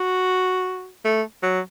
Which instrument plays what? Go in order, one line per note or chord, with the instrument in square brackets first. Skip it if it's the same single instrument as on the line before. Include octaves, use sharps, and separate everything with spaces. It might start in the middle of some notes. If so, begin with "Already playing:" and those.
Already playing: [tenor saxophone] F#4
A3
F#3